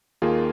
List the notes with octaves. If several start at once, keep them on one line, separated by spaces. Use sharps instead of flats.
D#2 D#3 A#3 F4 G#4